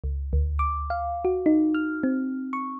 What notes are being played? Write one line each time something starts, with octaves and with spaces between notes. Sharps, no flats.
C#2
D2
D6
F5
F#4
D#4
F6
C4
C#6